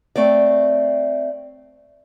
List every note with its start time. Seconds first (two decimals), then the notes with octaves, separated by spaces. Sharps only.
0.16 A3 C4 C#5 D5